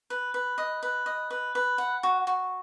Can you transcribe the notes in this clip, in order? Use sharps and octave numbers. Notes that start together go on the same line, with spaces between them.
B4
B4
D#5
B4
D#5
B4
B4
F#5
F#4
F#4